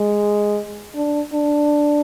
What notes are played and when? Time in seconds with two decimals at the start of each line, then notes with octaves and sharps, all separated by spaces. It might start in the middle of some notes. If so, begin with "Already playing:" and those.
Already playing: G#3
0.95 D4
1.33 D4